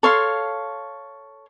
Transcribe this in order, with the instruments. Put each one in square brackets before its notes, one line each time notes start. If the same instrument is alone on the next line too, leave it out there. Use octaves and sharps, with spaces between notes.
[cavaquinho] A4 C#5 F5 C6